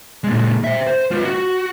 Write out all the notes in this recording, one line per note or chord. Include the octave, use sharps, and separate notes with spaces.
A#2 G#3
C5 E5
C5
F4 B4
F#4